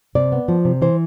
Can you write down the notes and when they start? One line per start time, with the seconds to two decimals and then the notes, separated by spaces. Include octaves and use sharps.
0.15 C3 D5
0.32 B3
0.48 F3
0.65 C3
0.82 E3 C5